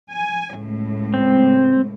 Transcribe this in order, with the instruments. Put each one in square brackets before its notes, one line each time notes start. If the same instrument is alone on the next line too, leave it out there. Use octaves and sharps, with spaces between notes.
[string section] G#5
C#2 A2
[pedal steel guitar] C4